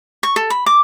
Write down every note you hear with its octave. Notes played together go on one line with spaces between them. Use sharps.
C#6
A4
B5
D6